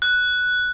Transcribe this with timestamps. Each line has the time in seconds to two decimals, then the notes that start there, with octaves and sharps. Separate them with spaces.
0.02 F#6